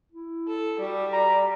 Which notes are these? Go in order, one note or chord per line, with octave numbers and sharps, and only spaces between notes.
E4
A4
G3 F#4
A#5